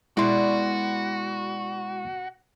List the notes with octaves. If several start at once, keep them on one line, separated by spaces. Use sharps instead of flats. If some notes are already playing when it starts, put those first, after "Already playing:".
B2 G#3 E4 F#4 D5 C6